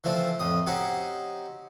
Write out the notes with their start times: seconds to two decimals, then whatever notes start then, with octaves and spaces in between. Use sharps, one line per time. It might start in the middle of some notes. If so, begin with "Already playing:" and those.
0.04 E3 F3 A3 C4 D4
0.39 F2 A2 D#6
0.67 C4 C#4 D#4 F#4 G4